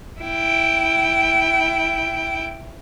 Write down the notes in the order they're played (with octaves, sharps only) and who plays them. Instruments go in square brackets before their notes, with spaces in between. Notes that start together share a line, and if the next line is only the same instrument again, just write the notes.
[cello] E4 G5